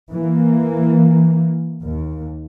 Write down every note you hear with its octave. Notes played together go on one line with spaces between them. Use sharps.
E3 A#3
D#2